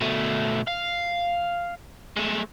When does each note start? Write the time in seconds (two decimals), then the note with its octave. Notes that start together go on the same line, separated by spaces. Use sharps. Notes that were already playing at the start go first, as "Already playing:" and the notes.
0.01 B2 A3
0.68 F5
2.16 G#3 A3